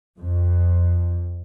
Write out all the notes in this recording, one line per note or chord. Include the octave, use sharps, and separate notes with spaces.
F2